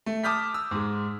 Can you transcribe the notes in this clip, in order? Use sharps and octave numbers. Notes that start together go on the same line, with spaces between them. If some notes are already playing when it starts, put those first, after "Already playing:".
A3
A5 D6 D#6 F6 G6 B6
E6
G#2 G#3